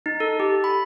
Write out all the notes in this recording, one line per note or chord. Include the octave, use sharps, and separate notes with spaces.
D#4
A4
G4
B5